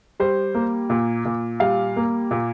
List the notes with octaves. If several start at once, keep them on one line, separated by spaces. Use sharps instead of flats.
G3 C5
A#3
A#2
A#2
G3 F5
A#3
A#2